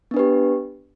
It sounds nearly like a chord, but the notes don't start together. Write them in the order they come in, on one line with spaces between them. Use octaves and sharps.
B3 D4 B4 G4